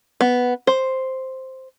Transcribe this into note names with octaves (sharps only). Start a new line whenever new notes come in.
B3
C5